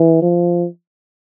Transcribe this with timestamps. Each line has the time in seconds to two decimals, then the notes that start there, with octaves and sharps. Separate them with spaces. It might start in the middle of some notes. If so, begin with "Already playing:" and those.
Already playing: E3
0.22 F3